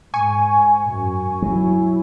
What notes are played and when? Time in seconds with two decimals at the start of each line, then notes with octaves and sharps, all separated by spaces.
0.14 G#2 G#5 C#6
0.89 F#2
1.42 F#3 E4